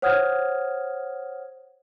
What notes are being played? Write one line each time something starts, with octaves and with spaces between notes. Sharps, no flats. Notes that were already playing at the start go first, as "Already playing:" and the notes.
C5 C#5 F#5 D#6 F6 G#6